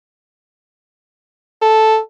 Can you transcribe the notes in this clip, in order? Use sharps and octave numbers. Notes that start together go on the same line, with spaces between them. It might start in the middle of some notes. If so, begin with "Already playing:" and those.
A4